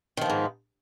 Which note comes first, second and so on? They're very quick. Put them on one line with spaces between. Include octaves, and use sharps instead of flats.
D#3 F3 B3 G#2